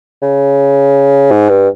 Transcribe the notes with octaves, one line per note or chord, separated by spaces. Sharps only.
C#3
G#2
G2